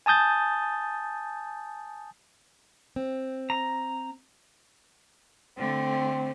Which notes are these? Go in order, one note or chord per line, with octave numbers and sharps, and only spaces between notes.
G#5 A5 D#6 G6 A6
C4
A#5
D3 A3 C4